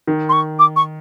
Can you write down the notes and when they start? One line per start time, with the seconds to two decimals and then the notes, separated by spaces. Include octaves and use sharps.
0.07 D#3
0.29 C6
0.33 C#6
0.59 D6
0.76 C#6